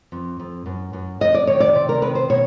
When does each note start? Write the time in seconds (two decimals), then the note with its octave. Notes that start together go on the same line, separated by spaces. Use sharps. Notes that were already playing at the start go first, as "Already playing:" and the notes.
0.12 F2
0.40 F2
0.66 F#2
0.93 F#2
1.21 F2 D#5
1.34 D5
1.47 D#3 C#5
1.60 D5
1.75 C3
1.89 A#4
2.02 D#3 B4
2.15 C5
2.29 B2 C#5